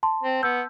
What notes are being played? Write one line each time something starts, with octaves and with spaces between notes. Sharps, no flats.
A5 C6
C4
B3 E6 G6